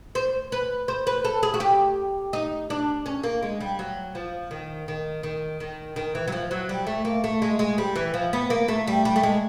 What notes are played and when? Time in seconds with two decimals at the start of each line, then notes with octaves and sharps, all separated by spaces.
0.15 C5
0.52 B4
0.88 C5
1.07 B4
1.25 A4
1.43 G#4
1.54 F#4
1.60 G4
2.33 D#4
2.70 D4
3.06 C#4
3.24 A#3
3.42 G#3
3.60 G3
3.79 F#3
4.15 F3
4.51 D#3
4.88 D#3
5.23 D#3
5.60 D#3
5.96 D#3
6.15 E3
6.27 F#3
6.32 F3
6.51 F#3
6.69 G3
6.87 A3
7.05 A#3
7.24 A3
7.42 G#3
7.59 G#3
7.78 G3
7.95 E3
8.14 F3
8.33 B3
8.50 A#3
8.68 A3
8.87 G3
9.05 G3
9.16 A3
9.23 G#3